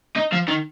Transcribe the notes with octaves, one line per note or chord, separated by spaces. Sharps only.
D#4
F3
D#3